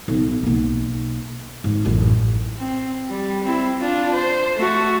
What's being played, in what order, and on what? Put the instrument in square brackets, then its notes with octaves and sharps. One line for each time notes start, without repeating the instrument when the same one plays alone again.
[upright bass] B1
B1 A#3
G#1
A1 F#2
[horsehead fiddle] C4
G3
C4 E4
D4 F4
C5
A3 F#4